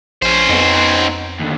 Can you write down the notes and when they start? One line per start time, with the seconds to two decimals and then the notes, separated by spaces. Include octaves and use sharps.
0.22 A#1 C#4 C5
0.49 F2 B3 D#4
1.39 D#2 D3